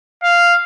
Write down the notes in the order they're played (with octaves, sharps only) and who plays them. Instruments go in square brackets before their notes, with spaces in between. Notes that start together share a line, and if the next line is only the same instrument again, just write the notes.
[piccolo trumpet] F5